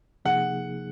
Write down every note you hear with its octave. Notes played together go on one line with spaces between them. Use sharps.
C3 F3 A#3 D#4 G#4 F#5